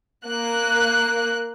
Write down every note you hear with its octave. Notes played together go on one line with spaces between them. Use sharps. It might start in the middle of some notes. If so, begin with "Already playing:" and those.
A#3 F#6